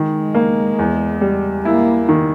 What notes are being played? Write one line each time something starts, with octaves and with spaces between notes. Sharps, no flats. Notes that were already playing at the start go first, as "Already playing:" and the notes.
Already playing: D#3 G#3
A#3
E2
G3
A#3 E4
D#3